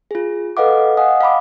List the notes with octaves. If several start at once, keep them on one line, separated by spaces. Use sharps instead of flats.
F4 G#4
A4 B4 D#5 F5 F#5 D6
D#5 F5 F#5 G#5 D#6
F5 A5 B5 D6